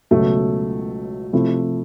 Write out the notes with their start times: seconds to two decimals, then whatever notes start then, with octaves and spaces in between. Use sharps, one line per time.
0.11 C#2 B2 F#3 A3
1.33 C3 F3 A3 C4 E4